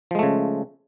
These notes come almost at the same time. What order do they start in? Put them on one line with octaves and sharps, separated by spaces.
F3 G#3 A3 C#3